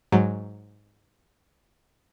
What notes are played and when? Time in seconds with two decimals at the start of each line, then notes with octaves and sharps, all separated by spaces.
0.12 G#2 F#3